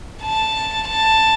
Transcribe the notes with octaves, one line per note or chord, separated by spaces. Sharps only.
A5
A5